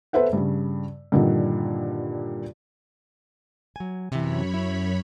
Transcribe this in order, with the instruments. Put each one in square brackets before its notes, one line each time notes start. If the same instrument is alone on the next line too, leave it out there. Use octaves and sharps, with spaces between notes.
[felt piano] B3 A4 B4 C5 E5 F#5
G2 C#3
G2 A#2 D3 D#3 F3
[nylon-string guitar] F#3 G#5
[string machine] F#2 C#5 B5 [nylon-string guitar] C3 E3
[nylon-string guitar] E4